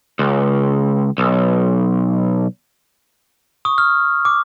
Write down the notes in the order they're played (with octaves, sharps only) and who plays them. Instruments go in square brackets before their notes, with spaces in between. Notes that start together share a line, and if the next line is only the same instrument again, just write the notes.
[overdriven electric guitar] C#2
B1
[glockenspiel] C#6 D#6
F6
D6